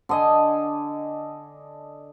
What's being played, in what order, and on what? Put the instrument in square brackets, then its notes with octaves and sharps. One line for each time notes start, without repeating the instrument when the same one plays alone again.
[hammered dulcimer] D3 D#5 G#5